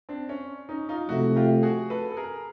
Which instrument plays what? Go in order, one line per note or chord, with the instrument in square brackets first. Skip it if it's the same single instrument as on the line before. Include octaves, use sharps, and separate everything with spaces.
[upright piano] C4 D4
C#4
C#4 D#4
D#4 F4
[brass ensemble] C3 F3 A3 [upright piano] E4 F#4
[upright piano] F4 G4
F#4 G#4
A4 B4
A4
G#4 A#4